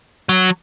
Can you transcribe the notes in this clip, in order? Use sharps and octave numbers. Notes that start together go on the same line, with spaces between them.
F#3